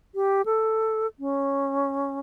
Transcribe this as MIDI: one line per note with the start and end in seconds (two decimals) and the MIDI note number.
0.15 0.42 67
0.46 1.07 69
1.19 2.20 61